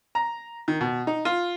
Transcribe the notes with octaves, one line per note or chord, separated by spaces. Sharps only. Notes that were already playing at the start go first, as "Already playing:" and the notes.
A#5
D#3
B2
D#4
F4